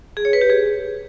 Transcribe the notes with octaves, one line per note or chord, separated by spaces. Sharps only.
G#4
C#5
B4
G4
G#4